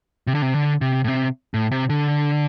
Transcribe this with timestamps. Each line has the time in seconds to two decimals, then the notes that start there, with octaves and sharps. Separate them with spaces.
0.27 C3
0.35 D3
0.42 C3
0.54 D3
0.81 C3
1.04 A2
1.08 C3
1.54 A2
1.71 C3
1.89 D3